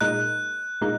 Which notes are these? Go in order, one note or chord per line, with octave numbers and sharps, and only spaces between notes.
A#2 G#3 D#4 A#4 F#6
A#2 G#3 D#4 A#4